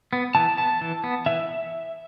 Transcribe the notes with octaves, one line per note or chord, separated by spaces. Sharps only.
B3
E3 A5
B3 A5
E3
B3
E3 E5